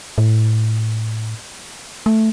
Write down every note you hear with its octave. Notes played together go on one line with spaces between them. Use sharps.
A2
A3